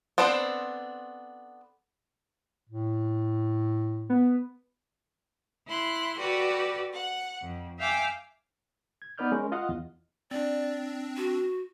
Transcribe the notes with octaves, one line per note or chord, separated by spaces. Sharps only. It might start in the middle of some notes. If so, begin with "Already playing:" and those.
B3 C4 D4 A4 C5
A2
B3
E4 C6 F#6
F#4 G4 A4 B4 D5
F#5
F2
E5 F5 G5 G#5 D6
G#6
B3 D#4 B4 D5 F6 G6
G#3 C#4 A#4
F4 D#5 F5 F#5
E2
C4 D4 D5
F#4